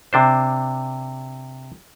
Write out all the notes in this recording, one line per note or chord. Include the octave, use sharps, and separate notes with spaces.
C3 D4 C5